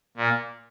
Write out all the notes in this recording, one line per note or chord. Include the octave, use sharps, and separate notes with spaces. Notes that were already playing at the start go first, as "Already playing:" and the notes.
A#2